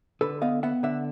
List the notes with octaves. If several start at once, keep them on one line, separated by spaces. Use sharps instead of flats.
D3 A4 B4
B3 D#5 F5
B3 E5 F#5
D3 E5 F#5